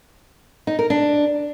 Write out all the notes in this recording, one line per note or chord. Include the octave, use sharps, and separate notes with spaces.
D#4
A#4
D4